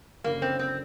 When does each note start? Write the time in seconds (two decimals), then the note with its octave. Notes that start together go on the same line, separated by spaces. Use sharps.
0.24 F#1 F#2 D3 A#3
0.42 C4
0.59 C4